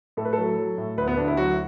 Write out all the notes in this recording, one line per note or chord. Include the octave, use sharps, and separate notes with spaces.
A2 A4
B4
F#3 A4
F#3
A2
D2 B4
B3
D2 D4
E4
F#3 F#4